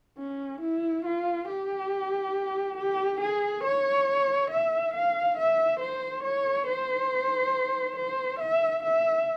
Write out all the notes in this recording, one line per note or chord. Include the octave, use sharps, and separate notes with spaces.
C#4
E4
F4
G4
G4
G#4
C#5
E5
F5
E5
C5
C#5
C5
C5
E5
E5